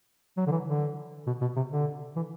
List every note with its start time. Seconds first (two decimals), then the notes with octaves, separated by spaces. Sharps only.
0.37 F#3
0.47 D3
0.52 E3
0.67 D3
1.27 B2
1.41 B2
1.56 C3
1.72 D3
2.16 E3